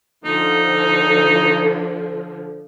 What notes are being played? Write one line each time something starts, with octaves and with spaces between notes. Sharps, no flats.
D3 F3 D#4